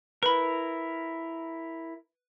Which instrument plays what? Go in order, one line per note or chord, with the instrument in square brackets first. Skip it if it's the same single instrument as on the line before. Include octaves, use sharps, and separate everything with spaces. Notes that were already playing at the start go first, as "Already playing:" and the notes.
[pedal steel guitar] E4 A#4 [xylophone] B4 B5